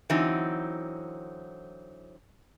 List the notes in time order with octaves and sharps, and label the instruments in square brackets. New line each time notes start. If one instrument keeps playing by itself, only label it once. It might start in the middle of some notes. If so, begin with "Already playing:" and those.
[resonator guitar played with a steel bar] D3 E3 F#3 C4 D#4